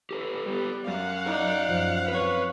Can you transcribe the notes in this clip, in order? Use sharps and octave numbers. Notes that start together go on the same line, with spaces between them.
G4 A4 B4
G3 B3
F#2 F5 F#5
D#4 D5
F#2 F3
C4 B4 C#5